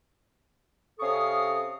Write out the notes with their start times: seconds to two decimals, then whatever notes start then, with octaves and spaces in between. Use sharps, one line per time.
0.99 C3 C#4 A4 F5 C#6 D#6